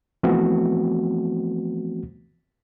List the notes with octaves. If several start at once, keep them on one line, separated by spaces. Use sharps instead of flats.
E3 F3 A3 B3 C4 F#4